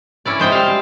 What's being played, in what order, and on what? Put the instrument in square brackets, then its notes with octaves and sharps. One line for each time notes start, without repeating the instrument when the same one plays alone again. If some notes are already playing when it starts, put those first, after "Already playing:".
[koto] C#4 E4 D5
[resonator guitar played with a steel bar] F3 E4 [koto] G#3 C5 G5
[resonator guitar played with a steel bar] G3 G4 [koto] F5